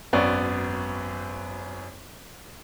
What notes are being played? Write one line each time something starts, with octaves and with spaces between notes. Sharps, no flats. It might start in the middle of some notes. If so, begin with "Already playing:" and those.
G#1 F#2 B3 C#4 D5 C#6